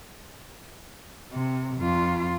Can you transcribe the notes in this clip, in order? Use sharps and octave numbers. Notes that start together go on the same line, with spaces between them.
C3
F2 F4